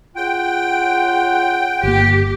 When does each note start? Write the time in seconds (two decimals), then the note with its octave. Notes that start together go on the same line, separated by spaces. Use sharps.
0.16 C#3 F4 F#5 G5
1.83 G1 A#3 G4